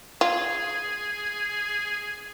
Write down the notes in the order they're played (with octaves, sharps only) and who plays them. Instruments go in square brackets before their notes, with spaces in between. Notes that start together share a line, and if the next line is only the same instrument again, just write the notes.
[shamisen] F4 [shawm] G#4